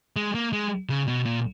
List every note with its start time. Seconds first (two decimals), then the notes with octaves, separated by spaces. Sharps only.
0.16 G#3
0.35 A#3
0.53 G#3
0.89 C#3
1.08 B2
1.25 A#2